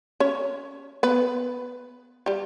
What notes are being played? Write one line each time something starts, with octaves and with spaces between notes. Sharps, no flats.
C#4 C#5
B3 B4
G3 G4